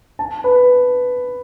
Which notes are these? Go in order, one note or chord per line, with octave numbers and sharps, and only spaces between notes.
A5
B4